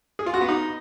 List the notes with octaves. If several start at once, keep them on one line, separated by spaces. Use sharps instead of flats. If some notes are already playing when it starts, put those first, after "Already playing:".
G#4
F4
F#4
B3
D#4